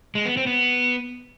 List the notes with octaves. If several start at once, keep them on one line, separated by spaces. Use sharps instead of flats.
G#3
B3
C4
B3